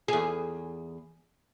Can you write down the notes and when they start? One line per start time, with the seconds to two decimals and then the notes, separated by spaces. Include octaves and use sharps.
0.08 E2 G#4